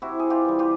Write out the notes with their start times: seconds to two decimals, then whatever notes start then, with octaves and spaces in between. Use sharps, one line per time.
0.02 C3 E4 F#4
0.19 G#4
0.30 F4 G4
0.45 E3 G3
0.59 F4 G4